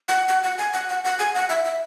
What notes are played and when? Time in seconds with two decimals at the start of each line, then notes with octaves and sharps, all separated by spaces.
0.08 F#5
0.28 F#5
0.43 F#5
0.58 G#5
0.73 F#5
0.89 F#5
1.04 F#5
1.19 G#5
1.35 F#5
1.49 E5
1.64 E5